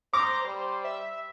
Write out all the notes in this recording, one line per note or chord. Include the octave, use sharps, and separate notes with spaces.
C5 A#5 D6
G3 C5
E5